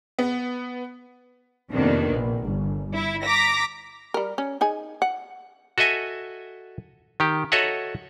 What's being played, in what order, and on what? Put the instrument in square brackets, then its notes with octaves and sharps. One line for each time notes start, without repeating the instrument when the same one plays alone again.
[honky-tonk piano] B3
[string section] F2 C3 D#3 A#3 B3 D4
A#1
G1
E4
A#5 D6 A#6 B6
[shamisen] G3 A#4
C#4
D#4 G#4 G#5
F#5
[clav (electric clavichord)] F#4 A4 D#5 E5 G#5
D#3 G4
F#4 A4 C#5 D#5 E5 F#5